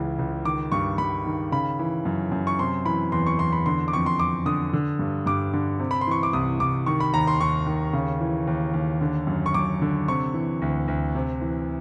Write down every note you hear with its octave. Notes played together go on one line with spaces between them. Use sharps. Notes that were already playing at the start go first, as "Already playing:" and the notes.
Already playing: C#2 C#3 E3
C#2
D#3 D6
G2 C#6
G2 B5
D#3
C#3 B5
E3
F#2
F#2
C#6
C3 C6
E3 B5
E2 C6
C#6
E2 C6
B5
D3 C6
D6
F2 C#6
C6
F2 D6
D3 D#6
D3
G2
G2 D6
D3
C3
B5
C6
E3 C#6
D6
C2 D#6
C2 D6
D#3 C#6
B5
D#2 A#5
C6
D#2 C#6
D#3
C#3
E3
D#2
D#2
D3
F#2
C#6
F#2 D6
D3
C3 C#6
E3
D2
D2
C3
E3